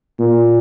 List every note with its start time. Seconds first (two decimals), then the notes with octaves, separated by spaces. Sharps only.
0.19 A#2